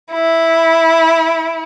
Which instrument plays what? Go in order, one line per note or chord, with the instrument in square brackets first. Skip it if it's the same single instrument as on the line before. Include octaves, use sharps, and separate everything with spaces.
[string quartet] E4